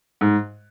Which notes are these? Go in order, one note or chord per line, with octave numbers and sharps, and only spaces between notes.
G#2